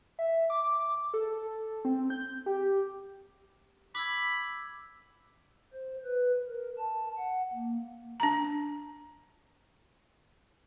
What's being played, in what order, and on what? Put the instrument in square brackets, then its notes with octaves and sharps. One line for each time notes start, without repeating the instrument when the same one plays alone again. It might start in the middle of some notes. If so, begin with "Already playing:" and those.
[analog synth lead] E5
D6
A4
C4
G6
G4
[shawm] B5 [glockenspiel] D6 E6 G#6
[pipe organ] C5
B4
A#4
A5
F#5
A#3
[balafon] D4 A#5